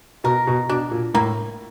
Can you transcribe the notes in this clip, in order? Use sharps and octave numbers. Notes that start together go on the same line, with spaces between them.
B2 A#4
B2
B2 D4
A#2
A2 A#3